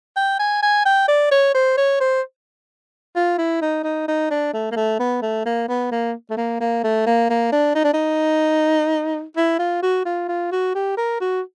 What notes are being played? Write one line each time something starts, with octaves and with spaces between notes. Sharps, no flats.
G5
G#5
G#5
G5
D5
C#5
C5
C#5
C5
F4
E4
D#4
D#4
D#4
D4
A3
A#3
A3
B3
A3
A#3
B3
A#3
A3
A#3
A#3
A3
A#3
A#3
D4
D#4
D4
D#4
E4
F4
F#4
F4
F4
F#4
G4
A#4
F#4